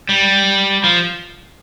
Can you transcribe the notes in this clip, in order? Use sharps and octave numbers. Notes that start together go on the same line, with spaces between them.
G3
F3